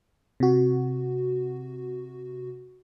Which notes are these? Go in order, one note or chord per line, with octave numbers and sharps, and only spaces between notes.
C3 F#4